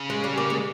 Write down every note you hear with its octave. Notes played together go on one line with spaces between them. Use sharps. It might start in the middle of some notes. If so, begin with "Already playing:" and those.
Already playing: C#3
G#3
G3
A#3
G#3